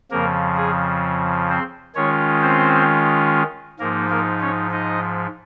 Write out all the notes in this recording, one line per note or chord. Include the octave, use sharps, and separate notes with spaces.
F2 C#3 F3 A#3 A#4
G#4
C4 C5
D#3 G#3 C#4 F4 C#5
C4 C5
G#2 F3 A#3 D#4 A#4
A#3 A#4
C#4 C#5
D#4 D#5